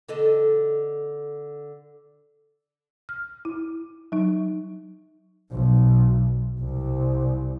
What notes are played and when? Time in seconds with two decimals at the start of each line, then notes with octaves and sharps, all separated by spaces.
0.09 D3 A4 D#5
3.09 F6
3.45 E4
4.12 F#3 D#4
5.51 B1
6.60 C2